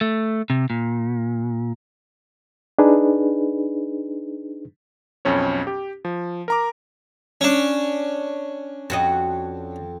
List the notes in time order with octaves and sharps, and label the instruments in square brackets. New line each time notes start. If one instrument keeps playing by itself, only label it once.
[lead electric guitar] A3
C3
A#2
[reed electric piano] D4 D#4 G#4 B4
[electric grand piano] B1 F2 C#4 C#5
G4
F3
A#4 A#5 D6
[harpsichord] C#4 D4
[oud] F2 F#4 D#5